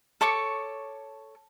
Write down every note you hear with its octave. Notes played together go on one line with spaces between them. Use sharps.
A4 C#5 C#6 D6